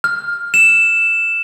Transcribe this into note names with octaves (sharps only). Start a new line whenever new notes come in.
F6
E7